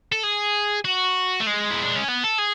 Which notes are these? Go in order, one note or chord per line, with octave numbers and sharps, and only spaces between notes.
A4
G#4
F#4
A3
G#3
E4
D4
C#4
B3
A4
G#4